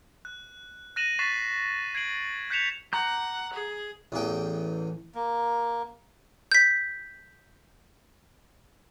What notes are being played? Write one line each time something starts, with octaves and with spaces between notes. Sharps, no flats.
F#6
F#6 A#6 D#7 E7 F#7
C#6 F#6 A6 B6 C7 E7
G#6 C7 D7 F#7
F#6 G6 B6 C#7 E7 F7
F#5 A#5 D6 G6
G#4
A1 E2 G#4 G5
A#3
G6 B6